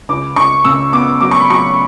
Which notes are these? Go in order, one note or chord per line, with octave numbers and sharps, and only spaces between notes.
C#2 D6
C#2 C#6
C#3 E6
B3 D6
F#3 D6
C#6
B5
F#3 C#6